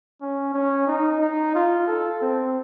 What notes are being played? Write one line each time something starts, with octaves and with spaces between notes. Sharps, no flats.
C#4
C#4
D#4
D#4
F4
A4
C4